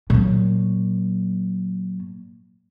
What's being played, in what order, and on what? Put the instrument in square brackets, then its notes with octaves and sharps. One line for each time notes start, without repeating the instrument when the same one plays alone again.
[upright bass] A#2 F#3